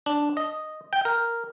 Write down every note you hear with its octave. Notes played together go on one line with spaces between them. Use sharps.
D4
D#5
G5
A#4